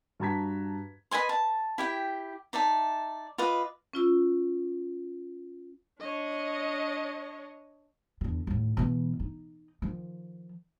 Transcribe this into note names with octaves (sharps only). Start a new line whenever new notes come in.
G2 F#4 A5 A#5 G#6 B6
B4 D#5 G#5 C6
A5
E4 G4 G5
D#4 D5 E5 A5
F4 B4 D#5 D6
C#4 F4 E6
D4 C#5 D#5
E2 D3
D#2 A2
B2 E3
D#4
D#3 F3